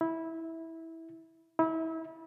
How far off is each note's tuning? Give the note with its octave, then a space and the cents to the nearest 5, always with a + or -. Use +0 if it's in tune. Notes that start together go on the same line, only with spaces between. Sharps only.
E4 -15
E4 -30